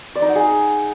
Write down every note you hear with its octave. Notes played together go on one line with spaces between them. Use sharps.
D5
D#4
F#5
G#4